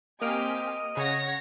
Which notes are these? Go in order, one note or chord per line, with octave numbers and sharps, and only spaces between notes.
A#3 C4 G4 D#5 G#5 F6 D7
C#3 C#5 F#5 A#6